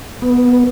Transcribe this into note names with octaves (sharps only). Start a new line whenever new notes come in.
B3